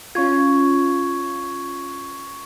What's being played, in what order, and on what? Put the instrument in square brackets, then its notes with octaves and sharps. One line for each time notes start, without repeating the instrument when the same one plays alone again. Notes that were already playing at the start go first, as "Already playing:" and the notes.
[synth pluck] C#4 F4 [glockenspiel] C#6 G#6